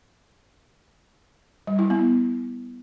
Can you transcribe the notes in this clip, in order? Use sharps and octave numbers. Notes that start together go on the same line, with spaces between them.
G3
E4
B3